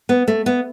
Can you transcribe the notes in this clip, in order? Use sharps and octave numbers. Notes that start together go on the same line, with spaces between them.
B3
A3
B3